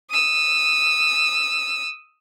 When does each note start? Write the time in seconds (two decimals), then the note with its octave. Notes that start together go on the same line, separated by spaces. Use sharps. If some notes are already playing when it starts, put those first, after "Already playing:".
0.11 D#6 E6